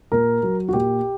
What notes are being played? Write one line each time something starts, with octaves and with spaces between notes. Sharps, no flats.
A#2 A#4
F#3
F#4
A#2 G4